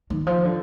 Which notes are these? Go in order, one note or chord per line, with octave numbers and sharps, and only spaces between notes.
D#3
F3
D3